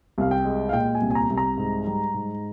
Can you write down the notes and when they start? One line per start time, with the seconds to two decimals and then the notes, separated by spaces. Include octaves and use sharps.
0.18 C2 F5
0.31 G5
0.45 G#3
0.69 F5
0.73 A#2 G5
0.95 G#5
1.01 C2
1.10 G#5
1.15 A#5
1.30 C2
1.38 A#5
1.57 G#2
1.87 G3
2.14 G#2